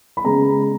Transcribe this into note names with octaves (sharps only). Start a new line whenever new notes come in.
B5
C#3 G#3 B3 A#5